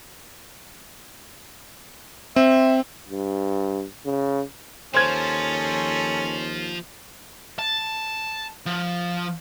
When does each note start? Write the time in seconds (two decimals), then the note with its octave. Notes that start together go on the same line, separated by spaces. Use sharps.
2.36 C4 E5
3.09 G2
4.05 C#3
4.94 D#2 F3 C#4 A4 C5 G#6
7.59 A5
8.66 F3